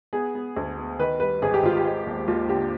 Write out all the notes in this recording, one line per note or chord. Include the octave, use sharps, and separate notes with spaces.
B3 G#4
B3
D2
B3
D#3 B4
G3 B4
G#1 G#4
G4
G#1 F4
G4
G#3
D#2
D#2 F4
D3 G4